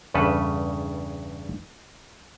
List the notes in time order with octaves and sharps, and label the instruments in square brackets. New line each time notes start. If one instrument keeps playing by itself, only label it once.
[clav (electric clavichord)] E2 G2 C#3 A4 B4